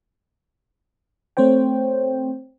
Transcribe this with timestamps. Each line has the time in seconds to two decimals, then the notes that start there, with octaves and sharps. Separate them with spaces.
1.37 A3 C4 C5 C#5 G5